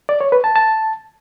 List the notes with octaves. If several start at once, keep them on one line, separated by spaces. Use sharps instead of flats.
D5
C#5
B4
A5
A5